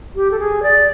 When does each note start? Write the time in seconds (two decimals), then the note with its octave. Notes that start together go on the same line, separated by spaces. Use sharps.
0.16 G4
0.31 A4
0.39 G#4
0.63 D5